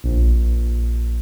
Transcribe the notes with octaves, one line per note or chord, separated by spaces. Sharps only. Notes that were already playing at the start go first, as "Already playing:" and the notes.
A#1